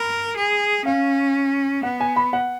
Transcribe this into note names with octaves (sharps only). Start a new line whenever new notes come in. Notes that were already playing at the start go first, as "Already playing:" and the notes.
Already playing: A#4 B5
G#4
C#4 F5
B3 F#5
G#5
B5
F#5